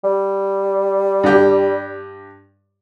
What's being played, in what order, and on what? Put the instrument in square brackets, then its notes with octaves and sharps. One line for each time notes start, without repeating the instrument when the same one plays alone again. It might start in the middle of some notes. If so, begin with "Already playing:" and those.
[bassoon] G3
[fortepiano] G2 G4